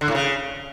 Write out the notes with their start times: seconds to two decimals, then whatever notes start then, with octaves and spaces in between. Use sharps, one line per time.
0.01 D3
0.08 A2
0.15 C#3